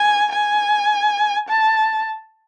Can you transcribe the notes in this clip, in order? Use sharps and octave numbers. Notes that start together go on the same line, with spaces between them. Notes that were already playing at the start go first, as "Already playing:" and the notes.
Already playing: G#5
G#5
A5